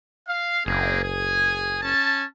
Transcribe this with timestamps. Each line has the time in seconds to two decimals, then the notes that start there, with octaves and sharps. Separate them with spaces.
0.27 F5
0.66 F#1 A#3 C4 G#4
1.02 G#4 G#5
1.82 C#4 A5